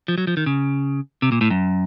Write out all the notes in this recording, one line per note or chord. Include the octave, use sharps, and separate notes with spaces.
F3
F#3
F3
D#3
C#3
C3
A#2
A2
F#2